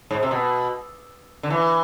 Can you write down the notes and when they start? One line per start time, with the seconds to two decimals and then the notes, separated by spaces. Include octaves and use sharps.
0.11 G#2
0.23 C3
0.31 B2
1.43 D3
1.50 E3